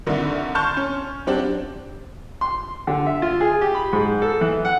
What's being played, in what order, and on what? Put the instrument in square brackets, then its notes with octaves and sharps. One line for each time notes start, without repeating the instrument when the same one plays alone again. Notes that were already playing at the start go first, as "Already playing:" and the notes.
[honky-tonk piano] C2 D3 D#3
A5 C6 C#6 F6 G6
C#4
F#3 C4 D4 G4
[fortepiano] C6
D3
E5
F4
G#4
G4
B5
G#2
A4
E3
F#5